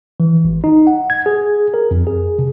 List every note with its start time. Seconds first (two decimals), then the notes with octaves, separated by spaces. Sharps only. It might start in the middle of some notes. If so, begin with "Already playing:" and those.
0.20 E3
0.45 G#1
0.64 D#4
0.87 F#5
1.10 G#6
1.26 G#4
1.74 A#4
1.91 F2
2.07 G#4
2.39 C3